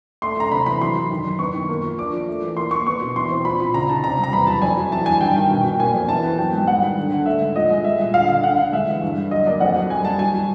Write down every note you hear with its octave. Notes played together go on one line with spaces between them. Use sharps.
A3 C6
A3 A#5
C3 B5
E3 B5
F#3 C6
F#2
D#3
F#2
B3 C#6
D#3
A#3
F3
D4 D6
F3
A3
E3
A#3 C6
A#3 C#6
B3 C#6
B2
E3 C6
C4
A#2 B5
A#2
C#3 A#5
D#4 A5
C3 A#5
G3
A#5
E2 B5
F#3 A5
F2 G#5
F#3
E3 A5
G3 G#5
G2 G5
D#3
B2
B2
A#3 G#5
F2
E3 A5
B3
F#3 G5
G#2
G3 F#5
D#3
D3
D3
A3 E5
G#2
F3 D#5
G#3
G3 E5
A#2
D3 F5
D3 F5
D3 F#5
D3 F5
G#3 E5
E3
G2
D3
F#3 D#5
A#3 D5
F2 F#5
F#3
G3 G#5
G3 A5
F#3 G#5
F#3